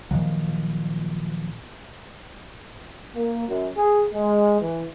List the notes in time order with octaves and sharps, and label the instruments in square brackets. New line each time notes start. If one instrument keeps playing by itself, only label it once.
[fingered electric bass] A#2 D#3 F3 F#3
[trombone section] A#3
F#2
G#4
G#3
E3